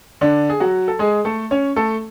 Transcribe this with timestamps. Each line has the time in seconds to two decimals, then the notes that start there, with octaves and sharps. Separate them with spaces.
0.21 D3 D4
0.50 G#4
0.60 F#3 F#4
0.88 A4
0.99 G#3 G#4
1.25 A3 A4
1.51 C#4 C#5
1.76 A3 A4